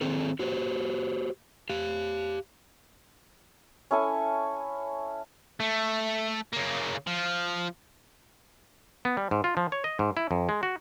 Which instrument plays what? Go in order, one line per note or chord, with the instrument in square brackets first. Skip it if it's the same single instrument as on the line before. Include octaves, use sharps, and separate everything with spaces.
[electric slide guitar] D#3 C4 G#4 A4
F#4 G4 C5
G4 F5
[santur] C#4 E4 A4 G#5
[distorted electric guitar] A3
C#3 A#3
F3
[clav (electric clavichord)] B3
G3
G#2
F4
F3
C#5
D#5
G#2
E4
F2
G#3
F#4